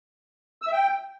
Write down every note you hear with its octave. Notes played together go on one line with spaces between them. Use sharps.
E6
E5
G5